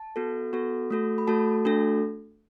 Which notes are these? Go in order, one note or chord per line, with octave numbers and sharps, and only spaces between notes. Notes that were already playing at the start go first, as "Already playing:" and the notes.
Already playing: A5
B3 F#4 A4
B3 F#4 A4
A3 F#4 A4
B5
A3 F#4 A4 A5
A3 D4 F#4 A4